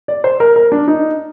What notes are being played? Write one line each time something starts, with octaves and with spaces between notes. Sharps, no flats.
D5
C5
A#4
A#4
D4
D#4